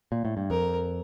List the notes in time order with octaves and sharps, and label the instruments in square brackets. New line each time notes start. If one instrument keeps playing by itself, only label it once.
[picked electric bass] A#2
A2
G2
[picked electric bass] F2 [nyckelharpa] A#4